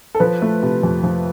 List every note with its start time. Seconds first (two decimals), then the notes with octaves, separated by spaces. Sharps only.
0.15 A4
0.20 F3 B4
0.42 A3
0.63 C3
0.83 F2
1.03 F3